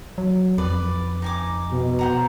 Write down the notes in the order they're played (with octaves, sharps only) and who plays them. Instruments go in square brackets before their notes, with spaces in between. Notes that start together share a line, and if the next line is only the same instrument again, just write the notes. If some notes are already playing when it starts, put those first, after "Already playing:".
[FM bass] F#3
[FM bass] F2 [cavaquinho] B4 D5
[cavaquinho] D#4 G#5 D6
[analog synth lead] B2
[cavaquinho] C5 F#5 A#5